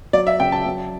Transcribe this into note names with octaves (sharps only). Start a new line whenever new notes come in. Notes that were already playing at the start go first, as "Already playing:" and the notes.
F#3 D5
E5
C#3 G5
A5
F#3